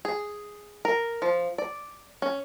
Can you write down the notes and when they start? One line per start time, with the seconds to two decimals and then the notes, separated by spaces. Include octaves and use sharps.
0.05 G#4
0.85 A#4
1.22 F3
1.58 D5
2.22 C#4